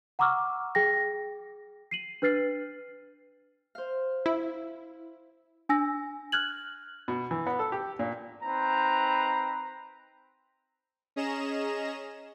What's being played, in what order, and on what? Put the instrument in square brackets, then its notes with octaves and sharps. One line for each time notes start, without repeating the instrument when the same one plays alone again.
[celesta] F#5 A#5 C#6 D6 E6 F6
G#4 G5 A#6
C7 D#7 F#7
D4 B4 F6 A6 C7
[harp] C5 F5
[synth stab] E4
[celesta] D4 G#5 E6 A#6
F6 F#6 G#6 F#7
[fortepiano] B2
E3
B3
A4
G4
A#2
[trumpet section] C4 D#4 B4 C5 A#5
[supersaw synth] C#4 G#4 D#5 A#5 E7